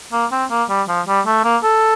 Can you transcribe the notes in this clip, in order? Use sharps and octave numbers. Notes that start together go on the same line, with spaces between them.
A#3
C4
A#3
G3
F3
G3
A3
A#3
A4